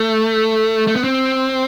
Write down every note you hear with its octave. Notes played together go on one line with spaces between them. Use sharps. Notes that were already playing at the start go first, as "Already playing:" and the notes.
Already playing: A3
A3
B3
C4